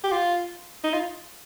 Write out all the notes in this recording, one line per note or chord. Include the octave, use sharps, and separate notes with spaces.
G4
F4
D#4
F4